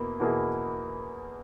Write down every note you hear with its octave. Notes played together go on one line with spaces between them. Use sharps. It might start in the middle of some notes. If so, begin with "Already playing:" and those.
Already playing: E2 B2 A#3 E4
E2 B2 A#3 E4 G#4